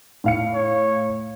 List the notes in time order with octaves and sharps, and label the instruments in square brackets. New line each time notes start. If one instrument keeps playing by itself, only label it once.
[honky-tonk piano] A2 F5 C#7
[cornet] C#5